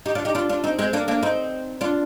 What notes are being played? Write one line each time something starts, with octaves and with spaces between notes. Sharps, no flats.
D#4 G4
D4 F4
D#4 G4
D4 F4
D4 F4
C4 D#4
G#3 C4
A#3 D4
A#3 D4
C4 D#4
D4 F4